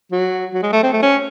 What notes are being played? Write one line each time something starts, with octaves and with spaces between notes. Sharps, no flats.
F#3
F#3
G#3
A3
C4
A3
C#4